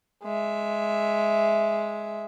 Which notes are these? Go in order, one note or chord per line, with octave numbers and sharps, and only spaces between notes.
G#3 E5